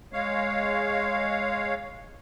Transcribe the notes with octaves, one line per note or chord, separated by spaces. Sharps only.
G#3 C#5 F5